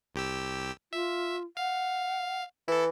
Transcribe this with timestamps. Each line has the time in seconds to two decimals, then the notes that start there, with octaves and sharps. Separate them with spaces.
0.15 C2 G4 E6
0.93 F4 E5
1.57 F5 F#5
2.68 E3 E4 A4